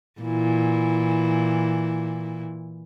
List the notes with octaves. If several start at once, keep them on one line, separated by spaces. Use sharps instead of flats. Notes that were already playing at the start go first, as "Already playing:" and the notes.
A#2 E3 E4